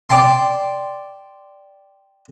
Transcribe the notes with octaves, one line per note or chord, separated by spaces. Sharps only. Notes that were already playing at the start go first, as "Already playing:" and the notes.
D5 G5 A5 C6